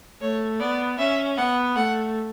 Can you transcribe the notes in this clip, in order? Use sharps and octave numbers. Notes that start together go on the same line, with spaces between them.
A3 C#5
B3 D5
C#4 E5
B3 F#5
A3 F#5